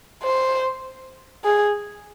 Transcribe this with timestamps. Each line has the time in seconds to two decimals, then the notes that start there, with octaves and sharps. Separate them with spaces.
0.23 C5
1.45 G#4